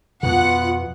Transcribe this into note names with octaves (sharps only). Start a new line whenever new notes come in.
F2 B2 B3 F4 F#5